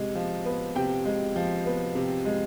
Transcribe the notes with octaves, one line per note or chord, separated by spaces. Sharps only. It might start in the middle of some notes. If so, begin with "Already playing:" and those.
Already playing: C3 G#3
F3
B3
C3 G5
G#3
F3
B3
C3
G#3